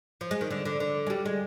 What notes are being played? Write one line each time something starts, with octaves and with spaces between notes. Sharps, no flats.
F3
G#3
D#3
D3
D3
D3
G#3
G3
G#3